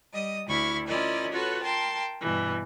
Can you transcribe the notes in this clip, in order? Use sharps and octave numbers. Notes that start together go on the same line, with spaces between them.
G3 D#5 D#6
D2 E4 B5 C#6 F6
C#4 E4 F4 A#4 D5 D#5
F4 F#4 A4 B4 C#5
A#4 G5 A5 C6
G2 B2 E3